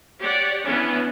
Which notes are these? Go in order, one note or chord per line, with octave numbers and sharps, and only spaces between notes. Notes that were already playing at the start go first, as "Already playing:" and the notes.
G4 C#5 D5 F#5
E3 B3 C#4 D4